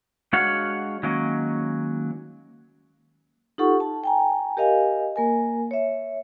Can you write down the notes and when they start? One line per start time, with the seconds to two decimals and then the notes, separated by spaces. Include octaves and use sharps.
0.33 G#3 D4 F#4 C#5 F5 F#5
1.03 D#3 F#3 G#3 A#3 C#4
3.58 D#4 F4 G4 A4 F#5 C#6
3.80 A5
4.04 G5 G#5 A#5
4.57 G4 A#4 D#5 F5 G#5
5.16 A#3 A#4 G#5
5.71 C#5 E5